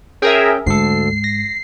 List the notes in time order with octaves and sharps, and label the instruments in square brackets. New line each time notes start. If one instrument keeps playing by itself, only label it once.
[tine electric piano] C#4 G5 [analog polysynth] G#4 A#4 E5
[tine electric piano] D2 A4 [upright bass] G#2 [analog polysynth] C7
[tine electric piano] A#6